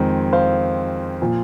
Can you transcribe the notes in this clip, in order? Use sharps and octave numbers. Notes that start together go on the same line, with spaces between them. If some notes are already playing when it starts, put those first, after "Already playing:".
Already playing: F2 D#3 G#3 C4
C5 F5
A#2 F3